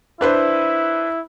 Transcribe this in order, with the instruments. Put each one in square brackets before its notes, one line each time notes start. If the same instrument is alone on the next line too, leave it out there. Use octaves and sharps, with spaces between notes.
[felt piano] D4 B4 C5 [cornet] E4